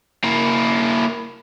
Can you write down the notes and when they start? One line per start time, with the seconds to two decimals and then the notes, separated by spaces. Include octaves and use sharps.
0.24 A#3 E4